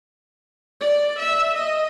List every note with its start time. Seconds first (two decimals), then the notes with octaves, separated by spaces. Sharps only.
0.81 D5
1.19 E5
1.55 D#5